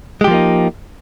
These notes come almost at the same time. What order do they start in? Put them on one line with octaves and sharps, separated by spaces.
G#3 G4 F3 A#3 D#4